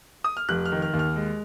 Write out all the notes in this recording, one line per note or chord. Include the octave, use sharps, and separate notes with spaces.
D#6
F6
F1 F#6
F6
D#3
F6
D#2
F6
G#3